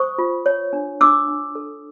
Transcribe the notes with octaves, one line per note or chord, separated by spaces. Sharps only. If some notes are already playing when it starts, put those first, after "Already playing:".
Already playing: C5 C#6 D#6
F4
C#5
D4
D4 D6 E6
D4
A4